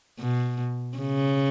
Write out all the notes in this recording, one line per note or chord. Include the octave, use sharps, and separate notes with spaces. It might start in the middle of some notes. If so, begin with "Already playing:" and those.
B2
C#3